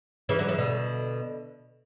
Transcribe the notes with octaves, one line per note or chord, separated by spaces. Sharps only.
C#3 E3
D3 F#3
C#3 E3
B2 D3